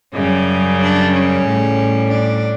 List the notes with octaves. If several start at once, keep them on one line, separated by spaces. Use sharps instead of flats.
F#2 C#3 G3 C#4
D4
C#4
A2 G3
D4